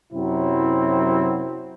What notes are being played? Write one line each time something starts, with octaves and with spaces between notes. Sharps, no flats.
F#2 C3 F#3 C4 E4